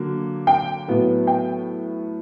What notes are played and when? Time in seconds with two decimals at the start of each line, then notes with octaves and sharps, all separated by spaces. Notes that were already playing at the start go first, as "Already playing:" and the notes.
Already playing: D3 F#3 A#3
0.47 G5
0.88 A2 F#3 B3
1.27 G5